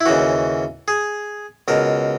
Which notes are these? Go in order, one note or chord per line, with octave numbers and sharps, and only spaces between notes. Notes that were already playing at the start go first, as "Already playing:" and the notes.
E4
D#2 C#3 E3 F#4
G#4
C#2 B2 A#4